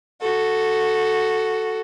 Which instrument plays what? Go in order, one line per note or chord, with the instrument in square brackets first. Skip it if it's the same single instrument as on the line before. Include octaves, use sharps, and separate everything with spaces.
[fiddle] F#4 A4